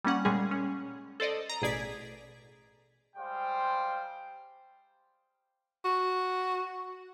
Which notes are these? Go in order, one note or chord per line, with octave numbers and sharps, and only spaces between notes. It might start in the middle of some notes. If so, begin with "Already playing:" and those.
G3 A#3 C#4 F#5
A#2 G3 G#3 C#4 G#4
C#4
A4 C5 D5 D#5
A#5
A1 B2 G#4 D5 G#6 B6
G3 G#3 C5 F5 G5
F#4